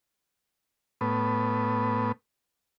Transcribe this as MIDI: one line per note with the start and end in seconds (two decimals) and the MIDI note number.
1.01 2.12 45
1.01 2.12 59